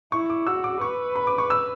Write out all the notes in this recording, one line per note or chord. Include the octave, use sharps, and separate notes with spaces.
E4 C#6
D6
F#4 E6
D6
B4 C#6
B5
D6
C#6
E6